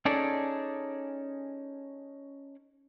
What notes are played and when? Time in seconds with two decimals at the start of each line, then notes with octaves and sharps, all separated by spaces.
0.05 C#4 D#4 G#4 A4 D5